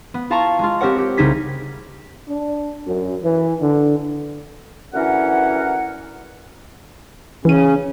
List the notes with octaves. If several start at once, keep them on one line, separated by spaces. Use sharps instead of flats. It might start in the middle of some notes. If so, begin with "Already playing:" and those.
B3
E4 F4 F5 A5 A#5 C#6
G#3 F4
C4 G4 A#4 C#5 F#5
G4
C2 C#3 D#4 G#6 B6
D4
F#2
E3
D3
D2 E3 C#4 E4 A#4 F#5
C#3 E3 C#4 D#7